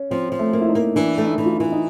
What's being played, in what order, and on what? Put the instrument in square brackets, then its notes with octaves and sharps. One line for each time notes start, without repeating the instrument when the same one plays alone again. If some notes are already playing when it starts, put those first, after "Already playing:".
Already playing: [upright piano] C#4
[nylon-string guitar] F3 [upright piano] C4
[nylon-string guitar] F3
[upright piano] A3
[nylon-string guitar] A#3
[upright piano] E4
D#4
[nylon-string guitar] A#3
[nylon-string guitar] E3 [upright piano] D4
[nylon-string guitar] A3
[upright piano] D#4
[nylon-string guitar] E3
[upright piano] F4
E4
[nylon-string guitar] E3
[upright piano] D#4